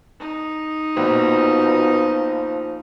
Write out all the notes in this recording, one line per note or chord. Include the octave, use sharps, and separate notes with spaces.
D#4
A#1 B2 F3